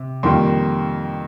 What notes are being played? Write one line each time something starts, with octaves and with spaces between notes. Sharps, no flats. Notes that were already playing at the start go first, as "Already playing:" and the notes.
Already playing: C3
F2 D#3 G3 A#3 G5 C6